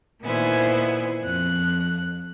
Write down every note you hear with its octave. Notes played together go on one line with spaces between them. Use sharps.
A#2 D#3 B3 E4 C5 G#5
F2 F#6